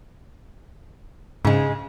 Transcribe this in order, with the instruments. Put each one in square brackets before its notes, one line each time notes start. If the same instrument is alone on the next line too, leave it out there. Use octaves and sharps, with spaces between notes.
[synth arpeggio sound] G#2 [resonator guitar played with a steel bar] C#3 G#3